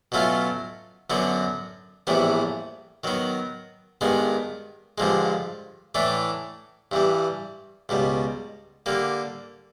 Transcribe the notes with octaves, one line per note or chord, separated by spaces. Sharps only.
B2 F#3 A3 C#4 F4
F#2 D3 F#3 B3
A#1 A2 E3 G3 B3
D#3 F#3 B3
G2 D#3 G#3 B3
G2 D3 F3 G#3
A2 E3 A3 D4
G2 E3 G3
C#2 B2 G3
D3 G3 A#3